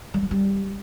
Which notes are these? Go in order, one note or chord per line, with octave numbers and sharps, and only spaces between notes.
G3
F#3
G3